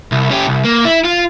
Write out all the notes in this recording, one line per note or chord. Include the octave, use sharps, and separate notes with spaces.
C2
C#4 G4
C2
A#3
E4
F4